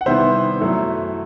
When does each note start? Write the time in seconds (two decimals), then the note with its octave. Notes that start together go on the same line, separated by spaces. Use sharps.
0.01 F#5
0.06 C3 D#3 G3 B3 E4 C5 E5
0.60 F#2 F#3 A3 E4